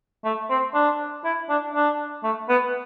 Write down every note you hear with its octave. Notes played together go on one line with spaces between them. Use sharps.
A3
C4
D4
E4
D4
D4
A3
B3